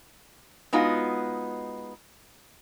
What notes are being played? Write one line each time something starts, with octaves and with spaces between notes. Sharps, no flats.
G#3 B3 D#4 F4 F#4